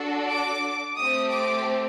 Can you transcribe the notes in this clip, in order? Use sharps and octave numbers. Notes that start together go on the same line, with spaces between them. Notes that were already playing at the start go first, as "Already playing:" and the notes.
Already playing: D4 F#4 A4
D6
A3 C4 G4 D#6
D6